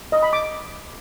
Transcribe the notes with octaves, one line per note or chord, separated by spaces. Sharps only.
D#5
B5
D6